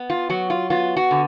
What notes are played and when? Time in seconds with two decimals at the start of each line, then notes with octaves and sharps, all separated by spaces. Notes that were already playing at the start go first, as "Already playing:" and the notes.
Already playing: B3
0.10 F4
0.30 F#3 F#4
0.50 F4
0.70 B3 F4
0.97 F#4
1.11 D3